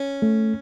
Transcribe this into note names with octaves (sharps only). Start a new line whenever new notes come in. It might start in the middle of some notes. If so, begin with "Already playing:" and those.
Already playing: C#4
A3